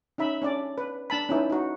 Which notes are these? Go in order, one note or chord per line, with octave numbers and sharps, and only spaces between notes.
C#4 D#4 E5 B5
C#4 D4 D5
B4
D4 A5 B5
C#4 D#4 E4 B4
D#4 F#4